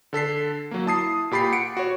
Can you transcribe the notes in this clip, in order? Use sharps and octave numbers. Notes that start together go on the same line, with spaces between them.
D3 A4 B6 C7
F#3 A#3
E4 A5 D#6 C7
A#2 G4 B5 A6 C7
F#5 C#7 D7
F#4 C#5